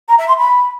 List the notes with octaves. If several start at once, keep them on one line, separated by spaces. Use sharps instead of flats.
A#5
E5
C6
B5